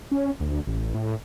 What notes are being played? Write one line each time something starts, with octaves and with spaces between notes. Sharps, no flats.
C#4
D2
A1
A2